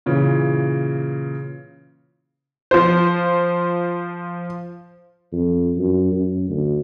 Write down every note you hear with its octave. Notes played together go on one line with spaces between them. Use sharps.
A#2 C#3 E3
F3 C5
F2
F#2
F#2
D2